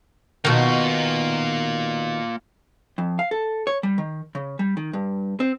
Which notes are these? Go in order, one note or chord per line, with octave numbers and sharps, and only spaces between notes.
B2 D#3 A#3 F4
F2
F5
A4
C#5
G3
D#3
C#3
G3
D#3
G2
C4